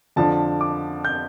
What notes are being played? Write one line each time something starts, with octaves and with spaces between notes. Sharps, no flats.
F2 D3 F3 D4 A5
D6
G6